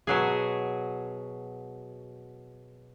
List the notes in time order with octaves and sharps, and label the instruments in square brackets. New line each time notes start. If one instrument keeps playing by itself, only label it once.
[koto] B2 F#3 G#4